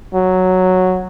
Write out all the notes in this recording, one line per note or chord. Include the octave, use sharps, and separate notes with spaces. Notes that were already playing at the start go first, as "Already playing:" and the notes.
F#3